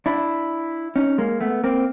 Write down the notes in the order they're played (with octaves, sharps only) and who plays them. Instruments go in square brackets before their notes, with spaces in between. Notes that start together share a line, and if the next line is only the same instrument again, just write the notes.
[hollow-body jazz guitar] D4 E4
C#4 D#4
G#3 A#3
A3 B3
A#3 C4